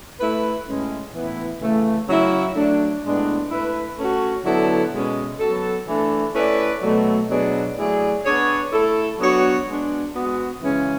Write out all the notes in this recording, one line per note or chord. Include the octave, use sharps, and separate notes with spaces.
A3 E4 B4
A2 G#3 C#4
A2 E3 B3 E4
C#3 E3 A3
C#3 F#3 C#4 E4
F#3 A3 D4
A2 G#3 B3 D4
A3 E4 B4
A3 C#4 F#4
D3 F#3 B3 E4 A4
B2 G#3 C#4
F#3 B3 F#4 A4
E3 A3 D4 A4
A3 C#4 E4 B4 D5
B2 F#3 A3
B2 F#3 B3 D4 G#4
F#3 A3 E4 G#4 D5
B3 D4 G#4 C#5
A3 E4 A4
F#3 B3 D4 F#4 C#5
G#3 B3 D4
G#3 B3 F#4
C#3 E3 G#3 C#4